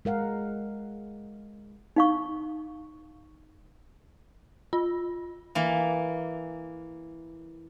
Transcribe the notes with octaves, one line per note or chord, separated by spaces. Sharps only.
G#3 A#4 F5 F#5
D#4 F5 C#6
F4
E3 A#3